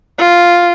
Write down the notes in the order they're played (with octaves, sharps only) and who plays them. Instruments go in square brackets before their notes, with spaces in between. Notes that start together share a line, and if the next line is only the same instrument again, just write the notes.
[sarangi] F4